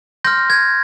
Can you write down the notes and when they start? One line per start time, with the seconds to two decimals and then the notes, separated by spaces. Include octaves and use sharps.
0.25 C6 F6 G6 A#6
0.50 G#6